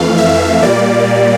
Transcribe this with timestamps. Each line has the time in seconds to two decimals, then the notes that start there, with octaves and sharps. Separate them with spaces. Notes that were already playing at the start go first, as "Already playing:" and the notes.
Already playing: F2 E3 A3 F5
0.18 E5
0.63 A#2 G3 A#3 D5